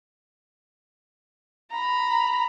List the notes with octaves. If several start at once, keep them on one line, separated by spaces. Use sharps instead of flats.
A#5 B5